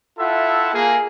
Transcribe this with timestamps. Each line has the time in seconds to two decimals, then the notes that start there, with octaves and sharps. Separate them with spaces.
0.19 E4 F4 A4 E5 F#5 A5
0.74 A#3 G#4